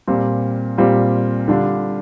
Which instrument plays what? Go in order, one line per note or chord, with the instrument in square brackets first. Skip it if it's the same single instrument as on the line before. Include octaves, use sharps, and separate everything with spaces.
[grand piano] A#2 G3 C4 F4
A#2 G3 C4 F4
D3 G3 D4 F4